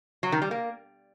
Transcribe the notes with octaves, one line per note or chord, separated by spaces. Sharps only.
F#3
D#3
G3
A#3